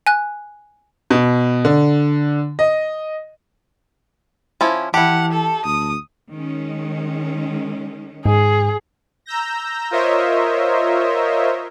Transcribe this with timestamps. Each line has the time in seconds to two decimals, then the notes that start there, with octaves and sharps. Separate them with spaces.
0.07 G#5 F#6
1.10 B2
1.65 D3
2.59 D#5
4.61 F3 C#4 E4
4.94 E3 E4 G4 F#5 A5
5.32 A4
5.65 D2 D#6
6.30 D#3 G#3 C#4
8.25 G#2 G#4
9.26 A#5 E6 G6 A#6
9.91 F4 A#4 C5 C#5 D#5 E5